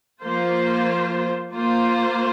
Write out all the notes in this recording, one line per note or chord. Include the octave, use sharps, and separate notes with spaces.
F3 A#3 F4 C5
A#3 F4 C5